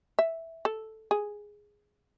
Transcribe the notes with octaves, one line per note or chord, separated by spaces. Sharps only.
E5
A4
G#4